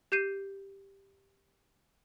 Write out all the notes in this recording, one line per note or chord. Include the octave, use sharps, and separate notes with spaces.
G4 G6 C7 D#7